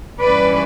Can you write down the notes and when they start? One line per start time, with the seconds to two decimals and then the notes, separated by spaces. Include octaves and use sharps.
0.20 G2 E3 G3 C#4 B4 D5